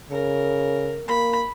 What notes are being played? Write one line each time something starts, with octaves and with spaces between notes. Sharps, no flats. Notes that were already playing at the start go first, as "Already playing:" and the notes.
C#3 A#4
A#3 B5